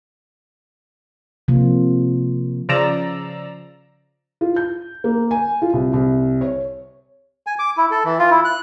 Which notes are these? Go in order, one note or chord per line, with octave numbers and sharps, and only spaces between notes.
C3 F3 A#3 F4
C#3 F3 D5 A#5 E6
F4
G6
A#3
G#5
F4
C2
C2
C#5
G#5
D6
E4
A4
E3
F4
E4
F#6